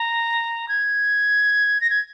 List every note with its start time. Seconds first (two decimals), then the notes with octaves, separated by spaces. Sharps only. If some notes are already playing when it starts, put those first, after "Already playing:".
Already playing: A#5
0.69 G#6
1.81 A#6
1.90 G#6